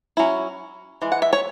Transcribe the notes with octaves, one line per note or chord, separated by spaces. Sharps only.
F#3 C#4 E4
E3 G#3
F#5
E5
C#5